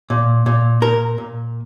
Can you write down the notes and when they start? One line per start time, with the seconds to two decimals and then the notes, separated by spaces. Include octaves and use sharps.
0.10 A#2
0.46 A#2
0.82 A#2 A#4
1.18 A#2